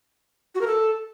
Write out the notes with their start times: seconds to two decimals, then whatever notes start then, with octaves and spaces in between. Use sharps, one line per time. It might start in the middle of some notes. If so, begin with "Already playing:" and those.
0.55 F#4
0.61 A#4
0.67 A4